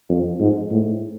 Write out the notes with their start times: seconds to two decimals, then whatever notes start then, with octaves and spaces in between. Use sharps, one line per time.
0.09 F2
0.40 G#2
0.71 A2